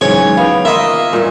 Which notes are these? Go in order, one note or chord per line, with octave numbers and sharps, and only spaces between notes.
G#2 C#3 E3 F#3 C#5
B3 F5 G5
A#3 F4 B4 D#5 E5
G2 A#2 F#3